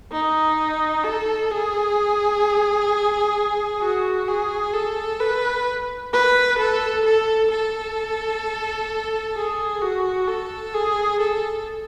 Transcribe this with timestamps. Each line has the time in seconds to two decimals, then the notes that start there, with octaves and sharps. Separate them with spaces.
0.12 D#4
1.04 A4
1.51 G#4
3.82 F#4
4.28 G#4
4.74 A4
5.20 B4
6.13 B4
6.59 A4
7.05 A4
7.51 A4
9.36 G#4
9.82 F#4
10.27 A4
10.74 G#4
11.20 A4